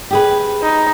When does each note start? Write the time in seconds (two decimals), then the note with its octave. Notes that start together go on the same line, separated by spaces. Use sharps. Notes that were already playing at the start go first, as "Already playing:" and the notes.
0.11 G4 G#4 B4
0.62 D#4